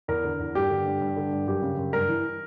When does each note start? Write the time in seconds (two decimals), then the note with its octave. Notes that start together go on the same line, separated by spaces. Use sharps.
0.08 E2 A#4
0.24 D3
0.40 E2
0.55 G2 G4
0.70 D3
0.86 G2
1.01 G2
1.16 D3
1.32 G2
1.47 F#2 G4
1.62 C#3
1.78 F#2
1.93 G2 A#4
2.09 E3